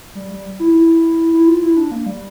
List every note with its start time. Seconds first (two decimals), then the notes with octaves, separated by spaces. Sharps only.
0.15 G3
0.30 G3
0.60 E4
0.74 E4
1.33 E4
1.47 F4
1.62 E4
1.77 D4
1.91 A#3
2.06 G3